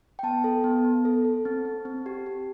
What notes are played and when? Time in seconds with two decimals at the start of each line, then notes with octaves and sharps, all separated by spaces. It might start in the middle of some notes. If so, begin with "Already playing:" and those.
0.19 G5
0.23 B3 A5
0.44 A4
0.64 B3
0.84 B3
1.05 A4
1.25 A4
1.45 C4
1.65 C4
1.85 C4
2.06 G4
2.26 G4